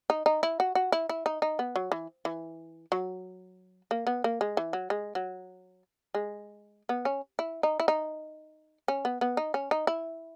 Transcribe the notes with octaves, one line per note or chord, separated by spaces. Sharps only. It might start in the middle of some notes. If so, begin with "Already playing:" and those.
D#4
D#4
E4
F#4
F#4
E4
E4
D#4
D#4
B3
F#3
E3
E3
F#3
A#3
B3
A#3
G#3
E3
F#3
G#3
F#3
G#3
B3
C#4
E4
D#4
E4
D#4
C#4
B3
B3
D#4
C#4
D#4
E4